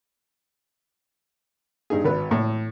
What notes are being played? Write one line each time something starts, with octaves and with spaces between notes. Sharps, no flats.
G2 D#4 G#4
G#1 B4
A2